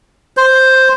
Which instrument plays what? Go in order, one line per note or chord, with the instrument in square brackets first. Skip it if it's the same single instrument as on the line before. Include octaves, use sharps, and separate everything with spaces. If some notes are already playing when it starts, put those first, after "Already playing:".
[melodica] C5